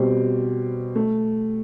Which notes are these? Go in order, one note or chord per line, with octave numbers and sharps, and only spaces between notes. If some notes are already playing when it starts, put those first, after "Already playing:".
Already playing: B2 G3 C4 G4
A3